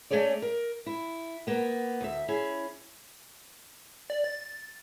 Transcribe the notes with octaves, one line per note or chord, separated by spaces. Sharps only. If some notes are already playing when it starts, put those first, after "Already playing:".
A3 C#4 G#4 C#5 D5
A#4
E4
A#3 B3
D2 E5
C#4 E4 G#4
D5
A6